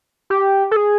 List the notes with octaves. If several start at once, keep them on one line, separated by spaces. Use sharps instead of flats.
G4
A4
G#4